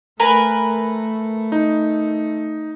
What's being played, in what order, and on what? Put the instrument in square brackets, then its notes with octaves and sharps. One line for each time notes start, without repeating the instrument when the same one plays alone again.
[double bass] A3 [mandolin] A#4 B4 G#5
[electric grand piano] D#4